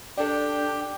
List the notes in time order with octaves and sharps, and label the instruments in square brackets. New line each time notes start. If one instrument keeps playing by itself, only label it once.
[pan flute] D4 [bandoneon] G4 G5 [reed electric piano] A4 D5